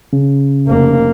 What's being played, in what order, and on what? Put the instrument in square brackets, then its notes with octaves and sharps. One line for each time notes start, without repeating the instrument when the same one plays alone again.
[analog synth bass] C#3
[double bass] F1 A#3